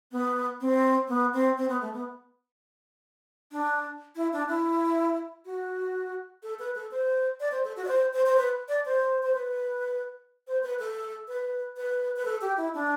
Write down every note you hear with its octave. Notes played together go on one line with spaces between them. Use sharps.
B3
C4
B3
C4
C4
B3
A3
B3
D4
E4
D4
E4
F#4
A4
B4
A4
C5
D5
C5
A4
F#4
D5
C5
C5
C5
B4
D5
C5
C5
B4
C5
B4
A4
B4
B4
B4
A4
G4
E4
D4